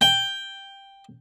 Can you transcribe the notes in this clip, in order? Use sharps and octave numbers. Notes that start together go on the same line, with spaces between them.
G5